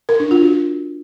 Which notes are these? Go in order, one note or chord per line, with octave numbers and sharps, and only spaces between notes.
A#4
D4
F4
F#4